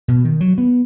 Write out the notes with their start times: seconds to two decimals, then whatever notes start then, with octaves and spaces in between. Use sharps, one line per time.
0.08 B2
0.24 D#3
0.41 F#3
0.58 B3